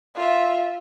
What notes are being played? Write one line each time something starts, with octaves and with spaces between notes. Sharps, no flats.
F4 E5